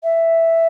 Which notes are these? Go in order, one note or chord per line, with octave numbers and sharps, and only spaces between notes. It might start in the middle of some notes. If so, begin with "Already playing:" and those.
E5